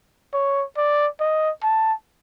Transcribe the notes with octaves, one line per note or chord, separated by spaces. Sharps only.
C#5
D5
D#5
A5